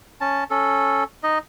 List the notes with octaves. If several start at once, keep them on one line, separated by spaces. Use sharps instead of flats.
C#4 A5
C#4 A4
D#4 D#5